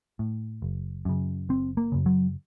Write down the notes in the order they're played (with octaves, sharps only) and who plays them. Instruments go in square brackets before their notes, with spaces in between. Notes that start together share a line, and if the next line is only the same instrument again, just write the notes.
[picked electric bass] A2
F#1
F#2 C#3
F#1 C4
A#3
F#2 C#3
F#3